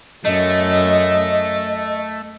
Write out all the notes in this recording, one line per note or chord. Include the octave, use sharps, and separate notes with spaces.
F#2 A3 D#5